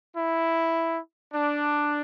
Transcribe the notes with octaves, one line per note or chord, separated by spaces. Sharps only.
E4
D4